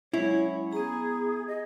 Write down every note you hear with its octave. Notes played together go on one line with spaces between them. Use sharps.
F#3 G#3 C#4 E4 C#5
B3 G#4 A#5
D#5